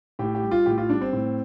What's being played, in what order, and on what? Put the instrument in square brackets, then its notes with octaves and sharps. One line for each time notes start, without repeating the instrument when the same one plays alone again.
[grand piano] A2 G4
G4
G3
F4
A2 G4
F4
G3 D4
C4
A2